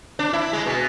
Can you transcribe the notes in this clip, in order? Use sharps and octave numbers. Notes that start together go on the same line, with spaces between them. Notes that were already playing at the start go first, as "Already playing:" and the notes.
D4
E4
G#3
B2